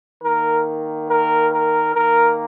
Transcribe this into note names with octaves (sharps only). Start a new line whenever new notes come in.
D#3 A#3 A#4
A#4
A#4
D#3 A#3 A#4